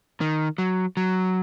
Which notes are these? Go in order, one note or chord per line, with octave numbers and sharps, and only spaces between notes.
D#3
F#3
F#3